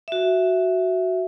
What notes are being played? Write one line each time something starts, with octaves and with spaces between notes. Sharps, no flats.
F#4 E5